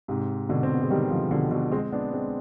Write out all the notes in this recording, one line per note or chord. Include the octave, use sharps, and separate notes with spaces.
G#2 C3
B2 D3
C4
B3
G#3
D#3 G3
D3 F3
B2 D3
B2 D3
G#3 C4
B3 D4
G#3 C4